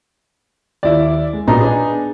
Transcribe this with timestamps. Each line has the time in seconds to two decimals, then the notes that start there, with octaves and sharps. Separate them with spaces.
0.83 D#2 E4 D5
1.33 G#3
1.47 A#2 B3 D4 D#4 F#4 A#5
1.61 D4 G#4